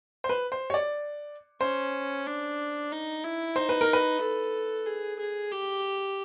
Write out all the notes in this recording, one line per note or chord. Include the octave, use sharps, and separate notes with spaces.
C5
B4
C5
C#5
D5
C#4 C5
D4
D#4
E4
D#4 C5
B4
A#4
B4
A4
G#4
G#4
G4